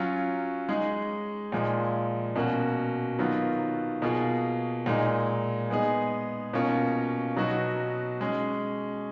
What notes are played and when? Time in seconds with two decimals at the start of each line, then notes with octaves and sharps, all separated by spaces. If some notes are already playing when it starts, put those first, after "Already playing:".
Already playing: F#3 C#4 F4
0.69 G#3 D#4 G#4
1.52 A#2 F3 G#3
2.35 B2 A#3 C#4 F#4
3.19 D#3 F#3 B3 F4
4.02 B2 A#3 F4 G#4
4.86 A#2 G#3 D#4
5.70 G#3 B3 D#4 G#4
6.53 B2 A#3 C#4 F4
7.36 B2 F#3 B3 D#4 F#4
8.21 G#3 C#4 G#4